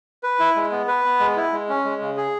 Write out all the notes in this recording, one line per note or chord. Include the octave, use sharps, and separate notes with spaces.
B4
E4
G#3
B3
B4
B3
G#3
E4
G#3
C#4
G#3
C#3
G#4